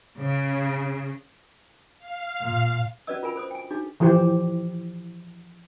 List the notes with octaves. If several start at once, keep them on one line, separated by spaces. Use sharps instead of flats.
C#3
F5
A#2
C#4 F#4 B4 D5 D#5 E6
F4 A#4 G#5 B5
A4 C5 D#6
G5 G#5
D4 D#4 F#4 G#4
E3 F3 E4 G4 C5